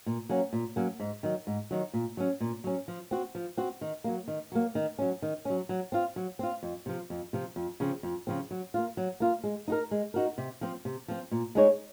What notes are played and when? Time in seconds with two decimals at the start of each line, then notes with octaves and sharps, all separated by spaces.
0.06 A#2
0.29 F#3 A#3 C#4
0.53 A#2
0.76 F#3 A#3 C#4
1.00 G#2
1.23 D#3 F#3
1.47 G#2
1.71 D#3 F#3
1.94 A#2
2.17 F#3 C#4
2.41 A#2
2.64 F#3 C#4
2.88 F3
3.11 C4 F#4
3.35 F3
3.57 C4 F#4
3.81 D#3
4.04 F#3 A#3
4.28 D#3
4.52 F#3 A#3
4.75 D#3
4.99 F#3 C#4
5.22 D#3
5.45 F#3 C#4
5.69 F#3
5.92 C4 F4
6.16 F#3
6.39 C4 F4
6.63 F2
6.86 C3 F3
7.10 F2
7.33 C3 F3
7.56 F2
7.80 C#3 F3 C4
8.03 F2
8.27 C#3 F3 C4
8.51 F#3
8.74 A#3 F4
8.97 F#3
9.20 A#3 F4
9.44 G#3
9.68 D#4 F#4 A#4
9.91 G#3
10.14 D#4 F#4 A#4
10.38 C3
10.61 F3 C4
10.85 C3
11.08 F3 C4
11.31 A#2
11.55 G#3 D#4 G#4 C#5